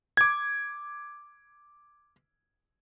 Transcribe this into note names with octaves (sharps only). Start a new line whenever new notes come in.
D6 G#6